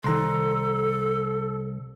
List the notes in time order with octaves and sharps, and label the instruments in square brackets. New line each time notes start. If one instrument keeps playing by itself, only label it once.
[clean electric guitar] C2 [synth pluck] D#3 A#5 C6 [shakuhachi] A4